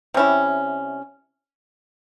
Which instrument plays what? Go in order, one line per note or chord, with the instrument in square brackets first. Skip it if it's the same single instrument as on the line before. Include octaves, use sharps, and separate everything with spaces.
[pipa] C3 G3 C#4 E4